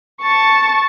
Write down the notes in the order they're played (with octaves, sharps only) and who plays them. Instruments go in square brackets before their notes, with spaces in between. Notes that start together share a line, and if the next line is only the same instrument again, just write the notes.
[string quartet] A5 C#6